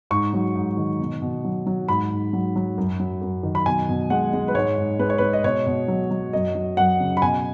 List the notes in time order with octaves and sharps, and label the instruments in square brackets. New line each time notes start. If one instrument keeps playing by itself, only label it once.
[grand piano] G#2 C#6
F#3
G#2
D#3
B2
B2
F#3
F#3
G#2 B5
G#2
F#3
F#3
F#2
F#3
F#2
D#3
B5
B2 G#5
B2
G#3 F#5
G#3
B4
G#2 C#5
G#2
G#3 B4
C#5
G#3 B4
D#5
B2 C#5
B2
F#3
F#3
F#2 D#5
F#3
F#2 F#5
C#3
B5
B2 G#5